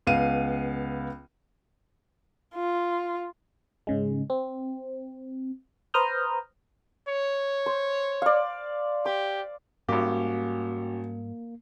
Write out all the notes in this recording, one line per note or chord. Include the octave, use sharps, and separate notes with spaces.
C#2 B3 F5 D#7
F4
G#2 C#3 G#3
C4
B4 C5 A#5 D#6 F6 G6
C#5
C5
D5 F5
G4 D6
G#1 G#2 G3 A#3 C#4 F#4 G4